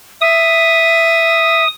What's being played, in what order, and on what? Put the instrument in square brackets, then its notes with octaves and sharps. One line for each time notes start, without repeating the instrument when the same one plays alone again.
[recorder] E5 [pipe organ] D#6